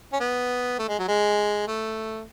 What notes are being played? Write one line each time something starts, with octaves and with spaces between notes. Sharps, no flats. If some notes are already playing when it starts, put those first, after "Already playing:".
C#4
B3
A3
G#3
F#3
G#3
A3